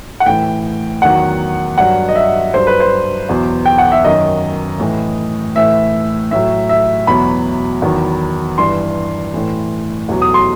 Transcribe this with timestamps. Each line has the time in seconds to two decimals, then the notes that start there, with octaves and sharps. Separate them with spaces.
0.20 F#5
0.26 A2 E3 G5
1.02 E2 D#3 F#3 F#5
1.77 G2 F#3 F#5
2.09 D#5
2.16 E5
2.54 G2 F#3 C5
2.67 B4
2.80 C5
3.29 E2 B2 F#3
3.66 G5
3.78 F#5
3.92 E5
4.04 F#2 D#3 F#3 D#5
4.80 A2 E3
5.56 A2 E3 E5
6.31 A2 F#3 E5
6.69 E5
7.07 E2 B2 F#3 B5
7.82 E2 D#3 F#3
8.58 G2 E3 C6
9.34 A2 E3
10.09 E2 B2 F#3
10.22 D#6
10.34 C6